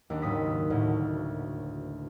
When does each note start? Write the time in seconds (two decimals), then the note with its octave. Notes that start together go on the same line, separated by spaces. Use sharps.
0.10 D#2 D4
0.22 F#1 G#2 D#6 B6
0.70 D2 A2